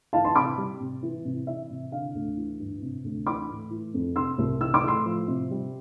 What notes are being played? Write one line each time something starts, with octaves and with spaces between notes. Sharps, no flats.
E3 F5 A5
A5 C6
C3 B5 D6
G3
C3
E3
C3
E3 E5
C3
D3 F5
D2
E3
G2
C3
D2
E3 B5 D6
A2
E3
F2
C3 C6 E6
C2
E3 E6
D6
A2 C6 E6
F3
C3
G3